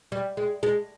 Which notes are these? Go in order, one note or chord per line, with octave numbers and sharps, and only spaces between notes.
G3
G#3
G#3